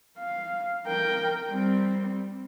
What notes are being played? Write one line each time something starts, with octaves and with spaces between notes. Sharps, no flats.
F5
A#4 G5
G3 C4